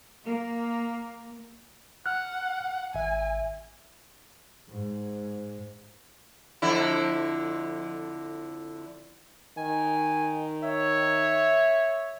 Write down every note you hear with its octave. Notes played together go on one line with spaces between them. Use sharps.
A#3
F#5 F6 F#6
G#1 E5 G#5
G#2
F2 D3 E4
D#3 G#5
C#5 E5